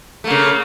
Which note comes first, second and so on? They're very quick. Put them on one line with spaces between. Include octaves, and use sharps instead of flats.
A3 A#3 C#3